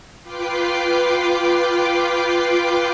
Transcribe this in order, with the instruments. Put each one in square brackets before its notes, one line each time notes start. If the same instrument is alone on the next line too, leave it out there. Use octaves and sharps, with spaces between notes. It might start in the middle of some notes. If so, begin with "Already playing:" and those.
[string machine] F4 B4 G5 D6 C7